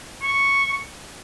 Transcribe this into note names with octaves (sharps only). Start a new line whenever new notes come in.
C#6